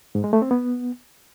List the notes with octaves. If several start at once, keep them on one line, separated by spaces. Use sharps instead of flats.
G#2
G#3
A3
C4
B3